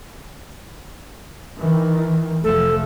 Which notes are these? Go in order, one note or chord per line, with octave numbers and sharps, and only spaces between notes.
D#3 E3
F1 F3 A3 A4